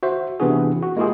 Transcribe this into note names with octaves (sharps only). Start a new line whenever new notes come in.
F#4 C5 E5
C3 E3 B3 D4 F#4 G#4
F#4
G#3 A#3 E4 F4 G4 G#4